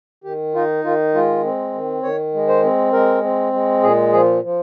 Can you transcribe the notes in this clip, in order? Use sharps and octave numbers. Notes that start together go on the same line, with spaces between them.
D#3 G4
D#4 F4
D#3 F4
G#3 F4
C4
D#3
D#3 C#5
G#3
C5
C4
G#3 A#4
C4
G#3
A#2 G#4
F3 G#4
F3